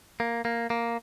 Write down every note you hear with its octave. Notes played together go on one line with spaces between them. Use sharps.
A#3
A#3
A#3